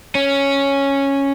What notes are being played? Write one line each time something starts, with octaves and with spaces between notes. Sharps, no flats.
C#4